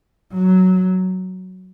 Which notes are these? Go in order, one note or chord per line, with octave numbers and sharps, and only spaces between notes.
F#3